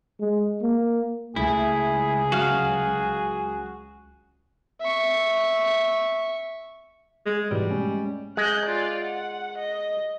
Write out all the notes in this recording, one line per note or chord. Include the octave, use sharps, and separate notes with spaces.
G#3
A#3
C#2 A3 E4 G#4
F#3 C#4 F#4 F5 F6
E5 C#6
G#3
G#2 B2 E3 G3
G#3 A3 C#4
G#3 F#6 G6
F4 D5
F#5
D#5